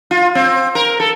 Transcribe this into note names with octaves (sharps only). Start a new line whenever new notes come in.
F4
C4
A#4
A4